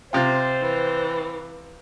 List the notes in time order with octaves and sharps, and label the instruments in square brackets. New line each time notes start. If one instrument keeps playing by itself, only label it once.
[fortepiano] C3 F4 [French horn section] C5 [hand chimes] G5 A6
[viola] E3